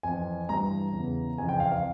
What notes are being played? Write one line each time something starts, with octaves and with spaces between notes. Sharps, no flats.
F2 E3 G#5
G2 E3 A#5
E2 C#3 E3
F2 C#3 E3 G#5
G5
F5
F5